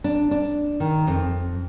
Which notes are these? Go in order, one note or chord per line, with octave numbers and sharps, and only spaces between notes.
D4
D4
D#3
F2